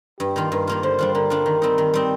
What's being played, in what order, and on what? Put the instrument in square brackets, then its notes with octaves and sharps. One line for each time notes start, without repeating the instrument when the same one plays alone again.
[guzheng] G2 [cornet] G4
[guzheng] D#3 A#3 F4
[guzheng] G2 [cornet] A#4
[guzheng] D#3 A#3 F4
[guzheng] D3 [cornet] C5
[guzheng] G3 D4 F4
[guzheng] D3 [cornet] A#4
[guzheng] G3 D4 F4
D#3
G3 C4 D#4
D#3
G3 C4 D#4